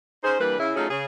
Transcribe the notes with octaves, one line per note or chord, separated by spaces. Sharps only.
C#4 D#4 G#4 C5
E3 G3 A#3 D4 B4
C#3 E4
F#3 A3 C#4 D#4 F4 G#4
C#3 G#4